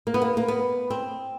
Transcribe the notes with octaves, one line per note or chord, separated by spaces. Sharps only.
A#3
B3
A#3
A#3
B3
C4